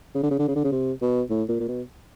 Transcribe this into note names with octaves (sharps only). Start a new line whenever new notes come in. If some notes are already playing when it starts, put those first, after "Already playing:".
C#3
D3
C#3
D3
C#3
D3
C#3
C3
B2
A2
A#2
A#2
B2